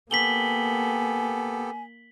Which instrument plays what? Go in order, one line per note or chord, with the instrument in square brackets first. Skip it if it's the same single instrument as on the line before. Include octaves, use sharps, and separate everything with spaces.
[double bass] A#3 [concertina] B3 G4 A4 [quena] G#5 [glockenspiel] B6 F#7 G7